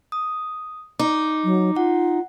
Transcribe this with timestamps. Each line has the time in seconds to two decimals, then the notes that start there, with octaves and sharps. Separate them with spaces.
0.12 D#6
0.99 D#4 D6
1.44 F#3
1.76 F4 F#5